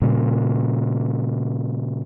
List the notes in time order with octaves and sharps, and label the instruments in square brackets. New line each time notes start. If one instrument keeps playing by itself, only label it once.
[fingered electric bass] A#2 C#3 G3